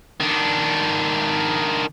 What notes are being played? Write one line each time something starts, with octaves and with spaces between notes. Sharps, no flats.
D#3 D4